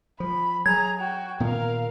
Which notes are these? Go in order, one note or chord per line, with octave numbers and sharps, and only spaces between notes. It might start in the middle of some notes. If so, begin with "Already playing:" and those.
F3 B5
F#3 G#4 A#5 G#6
F#4 G5
A#2 D#3 B3 A#4 F5